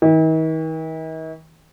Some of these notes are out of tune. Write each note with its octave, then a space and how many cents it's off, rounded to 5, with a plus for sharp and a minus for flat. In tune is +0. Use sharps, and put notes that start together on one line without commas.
D#3 +45